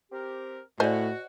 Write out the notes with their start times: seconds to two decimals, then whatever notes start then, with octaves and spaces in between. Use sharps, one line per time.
0.12 C4 G4 A#4
0.80 A2 F#4 C5 D5 D#5 G#5